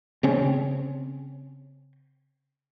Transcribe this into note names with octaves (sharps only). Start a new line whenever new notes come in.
C#3 C4 C#4